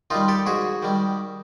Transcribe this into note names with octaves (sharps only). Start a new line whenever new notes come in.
D#3 G3 D#4 F4
G4 A4
G#2 F#4 G#4
D#3 G3